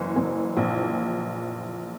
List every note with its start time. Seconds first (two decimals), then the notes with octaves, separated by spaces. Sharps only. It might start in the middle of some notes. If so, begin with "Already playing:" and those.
Already playing: F#1 E3
0.16 F#1
0.57 A#1